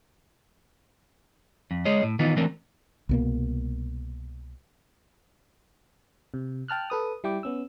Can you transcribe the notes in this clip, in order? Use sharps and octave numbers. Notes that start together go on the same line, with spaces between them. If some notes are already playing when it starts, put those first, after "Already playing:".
F2
G#3 G#4 C#5 D#5
A2
D#3 E3 B3 D#4 F4
E3 A3 C4 D4 A#4
C2 B2 A#3
C3
G5 A5 F6 F#6
A4 B4 D#6
G3 E4 G5 D6
B3 C#4 E6